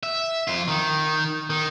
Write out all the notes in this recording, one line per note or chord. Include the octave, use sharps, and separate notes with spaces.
E5
F2 F4
D#3
D#3